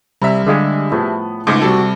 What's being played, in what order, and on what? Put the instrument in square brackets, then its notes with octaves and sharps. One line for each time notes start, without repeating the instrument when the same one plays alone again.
[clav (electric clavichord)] C2 A#5 [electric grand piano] G3 E5
[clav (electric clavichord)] D3 G#3 [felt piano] G#4 F5 G5
[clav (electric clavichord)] A2 [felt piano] F3 B3 G#4
[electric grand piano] C#2 G#2 A3 [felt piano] D6 A#6
[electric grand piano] C3 G3 A4 [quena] F#4